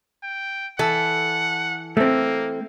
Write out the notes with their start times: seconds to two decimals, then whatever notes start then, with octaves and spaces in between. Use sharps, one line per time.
0.23 G5
0.79 E3 A4 F#5
1.97 A3 A#3 C4